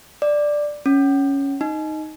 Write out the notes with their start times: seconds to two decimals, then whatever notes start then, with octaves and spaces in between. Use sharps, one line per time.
0.22 D5
0.86 C#4
1.61 D#4